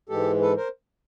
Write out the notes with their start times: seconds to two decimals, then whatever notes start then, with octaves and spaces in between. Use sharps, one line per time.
0.09 G#2 E3 G#3 G4 A4
0.41 A4 B4
0.57 A#4 C5